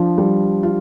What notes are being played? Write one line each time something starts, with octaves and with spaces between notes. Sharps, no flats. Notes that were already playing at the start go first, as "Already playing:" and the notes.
Already playing: F3 D4
G3
F4